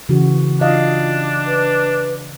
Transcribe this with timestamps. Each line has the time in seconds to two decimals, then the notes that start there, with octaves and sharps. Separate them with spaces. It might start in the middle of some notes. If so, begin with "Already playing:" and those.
0.09 C#3 E3 F#4
0.61 D4 F4 D#5 F5
1.47 B4